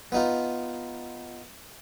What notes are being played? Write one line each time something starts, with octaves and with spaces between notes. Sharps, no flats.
B3 D#4 F4